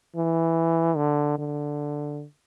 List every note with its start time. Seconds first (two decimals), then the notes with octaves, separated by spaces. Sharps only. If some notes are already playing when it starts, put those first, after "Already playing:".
0.16 E3
0.96 D3
1.38 D3